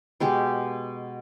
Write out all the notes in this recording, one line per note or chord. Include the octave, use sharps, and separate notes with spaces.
B2 G#3 G4